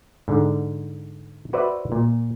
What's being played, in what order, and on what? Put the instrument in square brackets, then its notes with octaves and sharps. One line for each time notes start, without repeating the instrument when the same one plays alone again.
[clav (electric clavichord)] G#2 D3
F#4 B4 C5 D5 E5
A#2